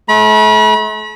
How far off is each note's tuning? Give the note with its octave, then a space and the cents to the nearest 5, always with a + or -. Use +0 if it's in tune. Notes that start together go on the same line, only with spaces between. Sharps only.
A3 -40 B5 -40